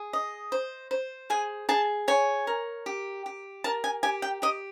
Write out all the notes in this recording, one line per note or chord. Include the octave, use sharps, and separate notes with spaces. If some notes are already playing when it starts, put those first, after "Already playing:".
Already playing: G#4
D#5
C5
C5
G#4 G#5
G#4 A5
C#5 G#5
A#4
G4
G4
A#4 A5
G#5
G4 G#5
G5
G4 D#5